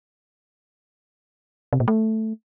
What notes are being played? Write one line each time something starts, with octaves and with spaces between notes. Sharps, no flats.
C3
A#2
A3